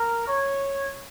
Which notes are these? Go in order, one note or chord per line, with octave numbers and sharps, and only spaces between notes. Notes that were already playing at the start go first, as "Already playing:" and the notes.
Already playing: A#4
C#5